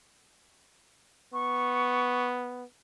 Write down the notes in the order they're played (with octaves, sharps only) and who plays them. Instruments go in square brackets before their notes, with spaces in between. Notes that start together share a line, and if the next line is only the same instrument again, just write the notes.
[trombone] B3 [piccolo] C#6